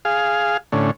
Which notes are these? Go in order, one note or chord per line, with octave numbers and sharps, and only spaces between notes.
G#4 F5
A2 D3 C#4